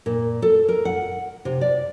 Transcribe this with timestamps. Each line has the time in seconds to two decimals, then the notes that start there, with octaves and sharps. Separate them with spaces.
0.06 A#2
0.42 A4
0.68 A#4
0.85 F#5
1.45 C3
1.61 D5